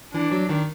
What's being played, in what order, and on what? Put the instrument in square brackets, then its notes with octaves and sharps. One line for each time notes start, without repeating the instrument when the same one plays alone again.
[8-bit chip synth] E3 [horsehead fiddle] D4
[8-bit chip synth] F#3
D#3